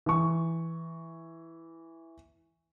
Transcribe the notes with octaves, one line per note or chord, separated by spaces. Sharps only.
E3 C#6